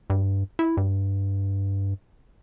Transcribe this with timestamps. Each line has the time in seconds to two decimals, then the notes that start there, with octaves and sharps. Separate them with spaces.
0.10 G2
0.59 E4
0.77 G2